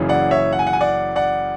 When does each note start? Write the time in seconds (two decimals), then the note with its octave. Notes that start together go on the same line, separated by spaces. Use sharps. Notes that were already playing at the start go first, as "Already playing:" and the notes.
Already playing: F#1 F#2 C#3 E3
0.09 D5 F#5
0.31 C#5 E5
0.53 F#5
0.59 G#5
0.67 F#5
0.73 G#5
0.81 D5 F#5
1.16 D5 F#5